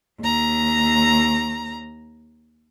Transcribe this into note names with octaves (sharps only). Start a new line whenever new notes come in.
D#2 A#5